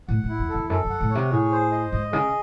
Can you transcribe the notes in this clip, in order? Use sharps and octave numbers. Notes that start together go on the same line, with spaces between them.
A2 F#5
A2
E4
E2
A4
E2
F#2 A4
F#2
F#5
A2
C3 C#5
A2 G#4
C5
D#5
G#2 D#5
C#3 G#4